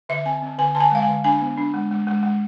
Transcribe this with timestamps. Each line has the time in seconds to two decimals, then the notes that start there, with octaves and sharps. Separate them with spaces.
0.09 D3 E5
0.26 C4 G#5
0.42 C4
0.59 D3 G#5
0.75 D3 A5
0.80 G#5
0.91 G#3 F5
1.02 G#5
1.08 D3
1.24 D4 G#5
1.41 B3
1.57 D4
1.74 G#3
1.91 G#3
2.07 G#3
2.23 G#3